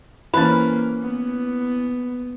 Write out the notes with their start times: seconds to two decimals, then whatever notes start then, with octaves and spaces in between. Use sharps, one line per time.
0.34 E3 F3 A#3 C#4 B4
1.02 B3